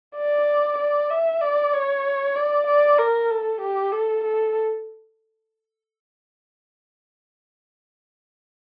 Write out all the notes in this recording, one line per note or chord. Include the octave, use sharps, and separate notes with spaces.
D5
D5
E5
D5
C#5
D5
D5
A#4
A4
G4
A4
A4